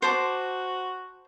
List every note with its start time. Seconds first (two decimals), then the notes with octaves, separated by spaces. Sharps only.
0.02 F#4 C5 A5 D6